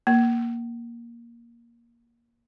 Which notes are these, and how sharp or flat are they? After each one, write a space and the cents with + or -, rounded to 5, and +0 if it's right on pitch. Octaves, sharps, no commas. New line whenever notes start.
A#3 +10